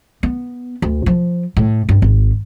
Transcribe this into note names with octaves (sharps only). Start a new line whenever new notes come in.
B3
D2
F3
A2
G2
G#1